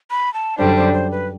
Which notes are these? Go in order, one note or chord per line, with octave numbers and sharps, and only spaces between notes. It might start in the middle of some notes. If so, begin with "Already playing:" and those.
B5
A5
F#2 D3 G3 D4 C5
C5
C5
B4